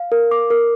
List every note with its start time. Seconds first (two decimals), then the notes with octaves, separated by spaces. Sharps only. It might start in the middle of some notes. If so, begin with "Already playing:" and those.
Already playing: F5
0.12 A#4
0.31 D6
0.50 A#4